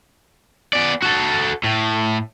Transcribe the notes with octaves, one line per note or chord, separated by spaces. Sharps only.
B3 D5
F#4 A4
A2